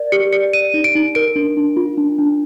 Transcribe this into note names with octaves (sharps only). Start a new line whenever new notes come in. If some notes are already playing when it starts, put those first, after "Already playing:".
Already playing: A#4 D5
G4 C#7
D5 C#7
D5 D#7
D#4
D7
D#4
A#4 D7
D4
D4
F4
D4
D4